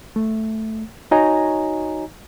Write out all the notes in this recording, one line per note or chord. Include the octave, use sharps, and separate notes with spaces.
A3
D#4 F#4 C#5 D#5 G#5 A#5